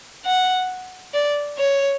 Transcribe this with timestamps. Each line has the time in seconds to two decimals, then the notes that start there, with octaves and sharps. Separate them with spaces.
0.26 F#5
1.14 D5
1.58 C#5